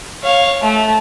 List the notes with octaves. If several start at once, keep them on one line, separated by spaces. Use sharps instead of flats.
C#5 F5
A3